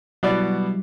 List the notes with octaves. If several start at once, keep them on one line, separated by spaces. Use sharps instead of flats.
B2 F#3 G3 B3 E4 D5